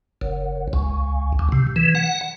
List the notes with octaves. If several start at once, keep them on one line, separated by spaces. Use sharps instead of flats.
F#1
C#2
D2
C3
E3
F#5